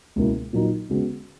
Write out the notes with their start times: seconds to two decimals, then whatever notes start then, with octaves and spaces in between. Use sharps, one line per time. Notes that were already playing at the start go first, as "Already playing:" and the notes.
0.16 C#2 B2 A#3 E4
0.53 A#2 F#3 A#3 D#4
0.89 C#3 G#3 B3 F#4